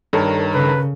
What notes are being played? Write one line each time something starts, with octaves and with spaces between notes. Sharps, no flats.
G2 D#3 A4 A#4 C#5
C#3 B4